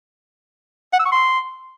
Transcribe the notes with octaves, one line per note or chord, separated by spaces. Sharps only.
F#5
E6
C#6
C6